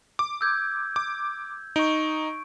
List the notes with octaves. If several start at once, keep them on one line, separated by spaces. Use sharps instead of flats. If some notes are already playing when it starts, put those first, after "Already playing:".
D6
E6 G6 G#6
D6
D#4 C#6 D7